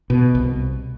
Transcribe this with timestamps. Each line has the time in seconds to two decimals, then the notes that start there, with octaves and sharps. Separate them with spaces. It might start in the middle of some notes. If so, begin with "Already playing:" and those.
0.10 B2
0.35 C2